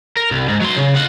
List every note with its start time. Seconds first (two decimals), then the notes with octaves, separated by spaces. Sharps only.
0.17 A#4
0.31 C2
0.48 G#2
0.61 F#3 C6
0.77 C#3
0.94 F4 F#5